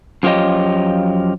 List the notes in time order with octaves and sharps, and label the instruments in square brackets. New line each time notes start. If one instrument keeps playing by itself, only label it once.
[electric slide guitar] F#2 F3 F4 G4 C#5 D#5